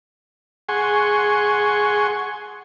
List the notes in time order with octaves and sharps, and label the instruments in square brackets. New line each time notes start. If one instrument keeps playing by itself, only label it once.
[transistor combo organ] G#4 F#5 G#5 C6 C#6